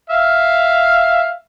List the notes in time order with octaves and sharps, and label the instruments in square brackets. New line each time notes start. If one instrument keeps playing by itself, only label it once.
[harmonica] E5 F5